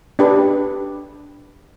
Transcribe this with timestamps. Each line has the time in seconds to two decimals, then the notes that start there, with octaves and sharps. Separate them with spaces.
0.19 D4 G4 B4